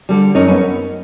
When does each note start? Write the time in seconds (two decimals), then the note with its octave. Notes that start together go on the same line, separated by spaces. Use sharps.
0.09 D3 G3
0.35 F#2 C#4 D#4
0.49 B3 C#4